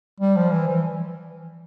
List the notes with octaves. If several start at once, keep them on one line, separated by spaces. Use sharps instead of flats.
G3
F3
E3
E3